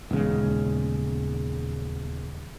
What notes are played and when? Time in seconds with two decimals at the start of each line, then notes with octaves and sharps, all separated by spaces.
0.11 D#1 E2 C#3 G#3